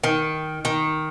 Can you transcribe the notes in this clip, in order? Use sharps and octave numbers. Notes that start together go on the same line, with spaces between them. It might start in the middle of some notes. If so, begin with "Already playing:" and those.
D#3
D#3